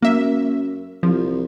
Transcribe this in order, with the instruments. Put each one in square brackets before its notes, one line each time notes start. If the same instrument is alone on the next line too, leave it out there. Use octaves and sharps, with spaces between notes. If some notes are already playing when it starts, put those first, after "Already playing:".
[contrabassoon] F#2 [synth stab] A#3 E5
[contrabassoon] C2 [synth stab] F3